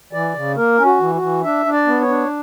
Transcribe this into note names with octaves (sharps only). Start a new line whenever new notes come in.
E3 D5
C#3
A#3 A#4
C#4
F#4
E3
F#4
E3
D4 E5
D4
D5
B3
C#5
D4